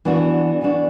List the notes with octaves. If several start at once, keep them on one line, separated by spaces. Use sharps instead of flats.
E3 B3 D4 F#4
E3 B3 D4 F#4